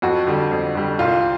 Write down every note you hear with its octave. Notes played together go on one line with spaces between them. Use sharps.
F2 F#4
D3 G3
F2
D3 G3
C2 F4